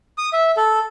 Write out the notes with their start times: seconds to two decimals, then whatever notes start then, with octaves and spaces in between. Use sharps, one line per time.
0.18 D#6
0.33 E5
0.57 A4